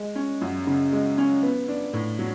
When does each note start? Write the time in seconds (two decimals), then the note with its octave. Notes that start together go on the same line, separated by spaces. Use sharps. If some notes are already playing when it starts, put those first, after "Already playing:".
Already playing: G#3
0.15 C#4
0.41 F#2
0.67 C#3
0.93 G#3
1.18 C#4
1.43 B3
1.68 D4
1.93 A2
2.19 F#3